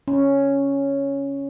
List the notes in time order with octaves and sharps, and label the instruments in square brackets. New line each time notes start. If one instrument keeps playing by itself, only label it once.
[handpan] C#4